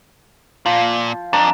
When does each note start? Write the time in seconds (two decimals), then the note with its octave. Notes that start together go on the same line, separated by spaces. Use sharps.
0.66 A#2 F3
1.33 F2 D4 D5 A#5